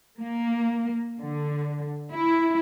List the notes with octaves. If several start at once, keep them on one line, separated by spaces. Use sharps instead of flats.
A#3
D3
E4